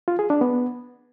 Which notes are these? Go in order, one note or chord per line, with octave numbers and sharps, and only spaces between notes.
F4
G#4
D4
B3